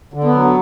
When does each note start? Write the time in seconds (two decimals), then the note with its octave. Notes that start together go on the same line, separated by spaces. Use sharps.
0.14 D3
0.24 B3
0.34 F#3